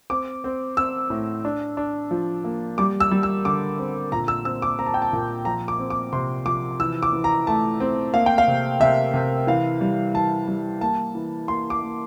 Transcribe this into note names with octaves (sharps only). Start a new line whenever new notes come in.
C4 D6
C4
C4 E6
A2
D4
D4
F3
A#3
G3 D6
E6
G3
E6
D3 D6
C4
A#2 A#5
E6
C4 E6
D6
C4 A#5
A5
G5
A5
A#2
F3 A#5
D6
C4
D6
C3 C6
F3 D6
E3 E6
D6
E3
A#5
A3 A5
C4
A#3 F5
G5
F5
C3
C3 E5
C3
E3 F5
G3
E3 A5
G3
A#3 A5
E3
A#3 C6
D6
A#3